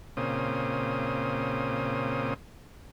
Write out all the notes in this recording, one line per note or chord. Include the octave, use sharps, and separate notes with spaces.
A#2 C#3 C4 D#6